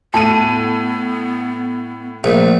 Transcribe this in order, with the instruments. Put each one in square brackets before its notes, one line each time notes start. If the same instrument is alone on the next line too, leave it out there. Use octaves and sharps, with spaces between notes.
[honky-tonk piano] A2 D#7 [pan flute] B3 [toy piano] A5
[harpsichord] A#1 [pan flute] A3